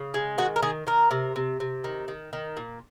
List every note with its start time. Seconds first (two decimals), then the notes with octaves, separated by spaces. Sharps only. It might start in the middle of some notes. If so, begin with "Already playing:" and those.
Already playing: C#3
0.14 G#3
0.38 D#3 F#4
0.56 A#4
0.63 D#3 G#4
0.87 D#3 A#4
1.11 C3
1.36 C3
1.60 C3
1.84 D#3
2.08 D#3
2.33 D#3
2.57 A#2